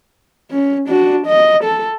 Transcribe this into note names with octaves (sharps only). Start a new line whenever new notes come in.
C#4
D4 F#4
D#5
A4